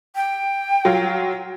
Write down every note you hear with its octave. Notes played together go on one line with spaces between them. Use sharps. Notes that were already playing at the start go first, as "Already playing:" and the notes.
G5
F#3 F4